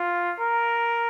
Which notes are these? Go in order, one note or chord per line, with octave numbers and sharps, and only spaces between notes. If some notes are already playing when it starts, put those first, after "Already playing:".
Already playing: F4
A#4